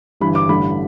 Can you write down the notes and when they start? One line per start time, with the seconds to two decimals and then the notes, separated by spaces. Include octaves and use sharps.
0.20 G1 G2 E3 B5
0.35 D6
0.49 A1 G2 D3 B5